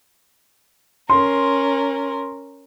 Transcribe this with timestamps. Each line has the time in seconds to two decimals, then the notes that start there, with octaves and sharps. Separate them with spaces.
1.10 C#4 A#4 C6